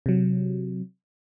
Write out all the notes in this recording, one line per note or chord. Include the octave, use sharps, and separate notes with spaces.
C3 F#3